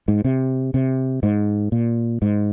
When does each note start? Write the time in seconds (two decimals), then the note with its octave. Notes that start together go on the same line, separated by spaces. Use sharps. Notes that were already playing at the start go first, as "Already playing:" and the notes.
0.08 G#2
0.25 C3
0.74 C3
1.23 G#2
1.72 A#2
2.22 G#2